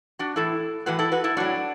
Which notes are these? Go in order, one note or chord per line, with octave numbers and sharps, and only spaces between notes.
D4 F#4
A2 E3 E4 A4
A2 E3 F#4 B4
E4 A4
F#4 B4
E4 A4
A2 F#3 D4 F#4